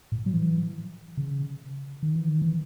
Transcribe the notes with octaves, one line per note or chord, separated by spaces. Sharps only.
A2
F#3
E3
C#3
D#3
E3
D#3
E3